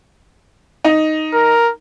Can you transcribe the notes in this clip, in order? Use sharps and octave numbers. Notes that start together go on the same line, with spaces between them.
D#4
A#4